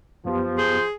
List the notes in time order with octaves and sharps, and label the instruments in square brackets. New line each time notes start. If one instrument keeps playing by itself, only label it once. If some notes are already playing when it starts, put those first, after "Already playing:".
[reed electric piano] F#2 B3 G4 [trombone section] F3
[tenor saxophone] G#4 [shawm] C5